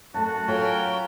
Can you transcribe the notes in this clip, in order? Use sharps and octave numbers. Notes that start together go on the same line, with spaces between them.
F#2 A3 F#4 A5
F#3 C#4 F4 A4 A#4 G5